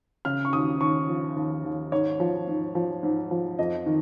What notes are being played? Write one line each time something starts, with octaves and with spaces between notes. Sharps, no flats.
C#3 F6
C#6
D#2 D#6
D#2 C#6
F3
D#2
D#2
G#2 C#5
F3
G#2
F3
G#2
F3
F2 D#5
D#3